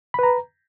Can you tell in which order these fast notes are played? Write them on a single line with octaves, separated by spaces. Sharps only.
B5 B4 A#5